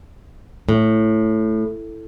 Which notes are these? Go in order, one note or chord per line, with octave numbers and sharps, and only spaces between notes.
A2